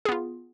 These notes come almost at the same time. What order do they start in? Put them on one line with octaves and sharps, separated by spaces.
G#4 B3 F4